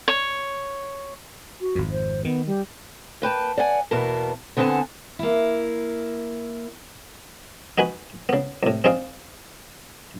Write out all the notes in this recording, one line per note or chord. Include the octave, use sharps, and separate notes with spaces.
C#5
F#4
G#1 F2
C5
D#3 B3
G3
A#3 B4 G5 A5
D5 F#5 G#5
E2 B2 A#3 B3 A#4 A5
D3 B3 C4 F#5 G#5 A5
A#3 E4
D#4 F#4 B4 G#5 B5
C#3 B3
C2 A2
C4 D#4 G#4 D5 F5